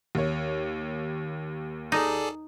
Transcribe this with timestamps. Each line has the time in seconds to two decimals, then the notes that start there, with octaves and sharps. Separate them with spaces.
0.15 D#2 C#5
1.92 D#4 G#4 A4 D5